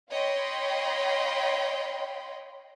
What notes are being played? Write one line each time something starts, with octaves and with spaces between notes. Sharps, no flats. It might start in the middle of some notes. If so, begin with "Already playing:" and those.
C#5 D#5 F5 G5 B5 C6